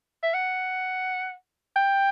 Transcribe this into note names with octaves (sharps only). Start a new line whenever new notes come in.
E5
F#5
G5